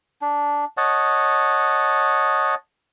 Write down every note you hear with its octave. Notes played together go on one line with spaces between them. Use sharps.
D4
C#5 D#5 F#5 A5